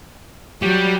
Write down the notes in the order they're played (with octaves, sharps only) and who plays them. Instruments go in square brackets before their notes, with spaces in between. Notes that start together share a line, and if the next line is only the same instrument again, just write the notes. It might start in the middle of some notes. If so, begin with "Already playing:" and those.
[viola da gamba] F#3 [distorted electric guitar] G3